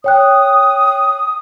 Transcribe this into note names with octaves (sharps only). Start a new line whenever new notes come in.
C#5 G5 D#6 F#6